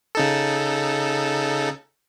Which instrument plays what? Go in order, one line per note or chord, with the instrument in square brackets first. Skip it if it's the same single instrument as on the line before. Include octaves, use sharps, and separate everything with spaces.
[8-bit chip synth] C#3 D#4 A4